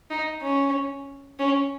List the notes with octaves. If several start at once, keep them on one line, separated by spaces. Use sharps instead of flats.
D#4
C#4
C#4